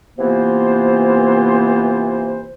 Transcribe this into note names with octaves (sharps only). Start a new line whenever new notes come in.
C3 E3 A#3 B3 F4 C5